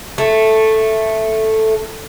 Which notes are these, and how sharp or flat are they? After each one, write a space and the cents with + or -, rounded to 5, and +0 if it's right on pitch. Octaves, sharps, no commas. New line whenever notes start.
A3 +0